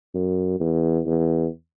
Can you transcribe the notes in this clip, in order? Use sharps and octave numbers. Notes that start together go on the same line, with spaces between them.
F#2
E2
E2